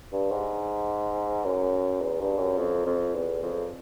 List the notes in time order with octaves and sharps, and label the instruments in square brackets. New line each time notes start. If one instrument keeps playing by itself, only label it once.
[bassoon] G2
G#2
F#2
E2
G2
F#2
F2
F2
E2
F2